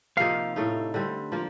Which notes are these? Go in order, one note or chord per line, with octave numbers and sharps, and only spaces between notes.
C3 F3 A#3 D#4 F5
A2 A3 D#4
D3 G3 C4
F3 A#3 F4